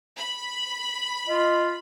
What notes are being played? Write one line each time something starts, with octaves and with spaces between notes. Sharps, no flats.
B5
F4 D#5